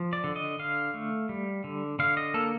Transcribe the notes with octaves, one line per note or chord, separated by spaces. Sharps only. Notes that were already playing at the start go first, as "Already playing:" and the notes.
Already playing: F3
D5
D3
D#5
D3 F5
A3
G3
D3
D3 F5
D#5
A#3 A4